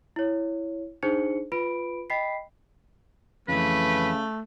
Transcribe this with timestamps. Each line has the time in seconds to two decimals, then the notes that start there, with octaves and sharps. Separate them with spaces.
0.16 E4 C#5
1.03 D4 D#4 G#4 C5 C#7
1.52 F4 B4 B5 D7
2.10 D#5 G5 B5 B6 C7
3.48 F2 C#3 E3 A3 B4